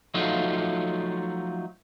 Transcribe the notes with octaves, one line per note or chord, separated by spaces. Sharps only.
F3 F#3 A3 D#4 F4